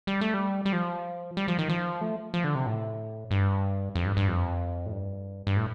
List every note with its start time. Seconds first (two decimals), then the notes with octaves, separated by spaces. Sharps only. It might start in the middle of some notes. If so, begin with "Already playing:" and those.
0.07 G3
0.21 A3
0.34 G3
0.65 G3
0.73 F3
1.37 G3
1.48 F3
1.59 D#3
1.69 F3
2.01 A3
2.34 F3
2.44 D3
2.55 C3
2.66 A2
3.31 G2
3.95 F2
4.05 G2
4.17 G2
4.28 F2
4.86 A2
4.92 G2
5.47 G2
5.57 A2